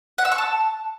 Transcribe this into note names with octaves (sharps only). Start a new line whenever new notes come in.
F#5
E6
C#6
A5